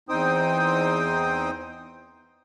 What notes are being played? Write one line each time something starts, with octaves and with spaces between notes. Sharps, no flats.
E2 C4 D#4 C5 G5 D#6